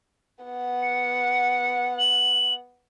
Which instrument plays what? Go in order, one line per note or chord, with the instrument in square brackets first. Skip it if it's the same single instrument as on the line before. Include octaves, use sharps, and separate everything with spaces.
[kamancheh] B3 F#5
[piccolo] C#7
F#7